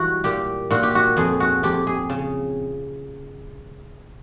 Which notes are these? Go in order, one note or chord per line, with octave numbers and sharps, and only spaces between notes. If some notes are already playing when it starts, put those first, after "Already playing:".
Already playing: E3 G3 F#4
A#2 G4
A#2 F#4
G4
F#4
F2 G#4
F#4
F2 G4
G#4
C#3